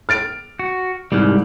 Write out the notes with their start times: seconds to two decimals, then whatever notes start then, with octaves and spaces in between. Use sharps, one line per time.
0.09 F6 A6 D7
0.59 F#4
1.12 C2 G#2 G3